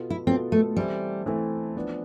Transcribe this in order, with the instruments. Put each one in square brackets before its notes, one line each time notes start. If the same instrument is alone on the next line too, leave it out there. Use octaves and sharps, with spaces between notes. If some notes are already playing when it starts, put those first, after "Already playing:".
Already playing: [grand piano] B2 B3 F4 A4
[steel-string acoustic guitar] E4
[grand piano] B2 B3 F4 A4 [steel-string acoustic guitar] C4
[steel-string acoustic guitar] A3
[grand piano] E3 A3 C4 E4 A4 [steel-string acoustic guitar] G3
[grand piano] E3 A3 C4 E4 A4
F3 B3 D4